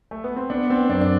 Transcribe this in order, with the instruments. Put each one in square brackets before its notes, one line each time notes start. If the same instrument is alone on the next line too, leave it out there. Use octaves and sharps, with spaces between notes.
[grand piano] A3
B3
C4
[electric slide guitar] B3 [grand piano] D4
[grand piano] C4
[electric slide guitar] F#2 [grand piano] D4
[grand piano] D4